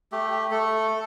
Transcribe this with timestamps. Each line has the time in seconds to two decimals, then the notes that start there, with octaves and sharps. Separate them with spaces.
0.12 A3 G4
0.32 G4
0.51 A3 A4